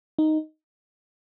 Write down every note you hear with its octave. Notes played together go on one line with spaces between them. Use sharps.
D#4